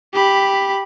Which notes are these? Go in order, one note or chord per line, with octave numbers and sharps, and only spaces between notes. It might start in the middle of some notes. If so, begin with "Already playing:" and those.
G4 B5